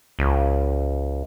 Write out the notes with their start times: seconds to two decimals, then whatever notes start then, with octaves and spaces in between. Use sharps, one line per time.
0.19 C#2